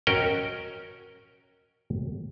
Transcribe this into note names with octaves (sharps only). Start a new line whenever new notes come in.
C#4 F#4 A#4 D#5 G5